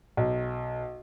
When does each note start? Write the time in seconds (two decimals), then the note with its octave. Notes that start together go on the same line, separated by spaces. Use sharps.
0.17 B1